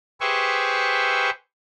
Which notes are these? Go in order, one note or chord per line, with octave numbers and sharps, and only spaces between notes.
G4 G#4 B4 C5 E5 C#6